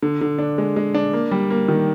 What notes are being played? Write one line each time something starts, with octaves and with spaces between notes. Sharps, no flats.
D3
D3
D4
G#3
G#3
D4
A#3
G3
A#3
D#3